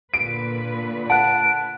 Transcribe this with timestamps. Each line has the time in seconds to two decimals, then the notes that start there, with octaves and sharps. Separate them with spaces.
0.14 A#2 D3 B4 D7
1.10 F#5 A5 F#6 D7